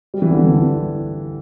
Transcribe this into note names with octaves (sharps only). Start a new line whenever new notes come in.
G3
E3
D3
E3